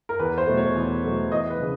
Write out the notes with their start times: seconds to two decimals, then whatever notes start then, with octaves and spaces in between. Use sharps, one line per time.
0.09 A#4
0.19 E2 B4
0.38 C5
0.47 B2 F#3 A3
0.57 C#5
0.75 E2
1.03 B2 F#3 A3
1.31 E2 D#5
1.50 B4
1.59 C#3 F3